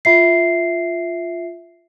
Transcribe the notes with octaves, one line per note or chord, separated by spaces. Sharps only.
F4 E5 C7